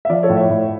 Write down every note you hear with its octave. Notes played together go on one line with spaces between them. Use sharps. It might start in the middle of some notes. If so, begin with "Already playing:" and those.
E5
F3 D5 F5
A4 C#5
A2
C#5 E5
A2